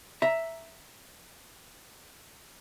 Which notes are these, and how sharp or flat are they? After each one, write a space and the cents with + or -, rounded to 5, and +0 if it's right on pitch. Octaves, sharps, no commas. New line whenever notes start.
E5 +0 A#5 +0